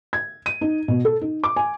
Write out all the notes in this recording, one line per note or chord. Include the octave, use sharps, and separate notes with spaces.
G#6
D#7
D#4
B2
A4
D#4
D6
G#5